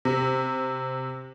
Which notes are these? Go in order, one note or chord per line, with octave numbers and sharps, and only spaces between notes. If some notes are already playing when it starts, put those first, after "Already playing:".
C3